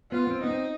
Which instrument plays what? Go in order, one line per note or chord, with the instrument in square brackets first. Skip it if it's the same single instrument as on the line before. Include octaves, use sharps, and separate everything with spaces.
[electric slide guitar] B3 [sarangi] F4
[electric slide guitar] B3
C4
[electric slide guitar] B3 [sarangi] D#4
[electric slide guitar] C4